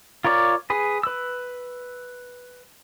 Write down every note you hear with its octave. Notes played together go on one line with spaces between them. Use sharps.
F4 A#4 C#5 D5
G#4 B4
B4 E6